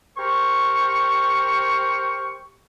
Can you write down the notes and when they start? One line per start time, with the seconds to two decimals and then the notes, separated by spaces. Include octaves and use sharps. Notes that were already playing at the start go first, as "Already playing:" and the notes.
0.16 G4 A#4 C5 C#6